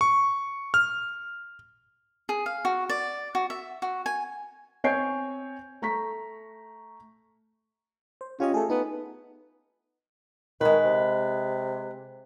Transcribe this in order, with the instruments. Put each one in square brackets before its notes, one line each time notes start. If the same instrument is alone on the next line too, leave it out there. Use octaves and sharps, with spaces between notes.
[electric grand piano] C#6
F6
[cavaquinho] G#4
F5
F#4
D5
F#4
E5
F#4
G#5
[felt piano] C4 C#5 G#5 G6 C7 D7
A3 A#5 C#6 B6
[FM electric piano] C5
[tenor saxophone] C#4 [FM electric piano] F4 G4 D#5
[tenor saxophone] A3 [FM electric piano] G#4 A4
[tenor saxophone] B3 [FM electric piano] D#4
[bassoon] D#3 [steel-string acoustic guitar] G#3 B4
[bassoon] C3